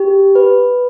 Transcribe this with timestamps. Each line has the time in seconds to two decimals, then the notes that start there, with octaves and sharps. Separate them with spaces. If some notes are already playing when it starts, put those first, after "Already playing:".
Already playing: G4
0.35 B4